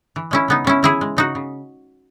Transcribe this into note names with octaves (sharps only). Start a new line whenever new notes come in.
E3
G#3 C#4 E4
C#3 B3 D#4
C#3 C#4 E4
E3 E4 G#4
G#3
C#3 D#4 F#4
C#3